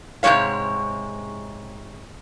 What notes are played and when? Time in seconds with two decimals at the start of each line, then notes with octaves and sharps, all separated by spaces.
0.23 G#2 C3 F3 G#3 C#5 F5